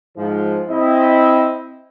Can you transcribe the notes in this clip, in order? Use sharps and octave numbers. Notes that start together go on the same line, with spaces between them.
G#2 F3
C4 E4 D#5